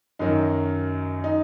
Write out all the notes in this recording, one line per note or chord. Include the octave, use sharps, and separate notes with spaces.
F#2 D#3 F#3 D#4
D#4